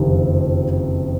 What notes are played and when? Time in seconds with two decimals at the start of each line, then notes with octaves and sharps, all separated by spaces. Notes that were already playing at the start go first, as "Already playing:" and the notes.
Already playing: F#1 F2 C3 D#3